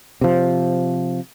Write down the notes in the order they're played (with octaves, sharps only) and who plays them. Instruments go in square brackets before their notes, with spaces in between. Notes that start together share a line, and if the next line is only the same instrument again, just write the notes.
[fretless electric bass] C3 F3